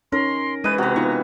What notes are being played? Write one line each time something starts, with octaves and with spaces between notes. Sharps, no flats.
C#4 D#4 A#4 C#5 C6
E3 G#3 B4 D#5 D#7
C3 F#4 B4 A#5
B3 D#4 F4 C#6